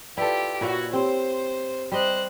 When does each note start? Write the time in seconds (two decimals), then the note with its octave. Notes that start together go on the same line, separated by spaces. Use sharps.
0.17 E4 F4 G4 A4 B4 D5
0.61 A#2 E4 F#4 C#5
0.93 C4 G4 C5 C#5
1.92 G3 C5 D#5 F#6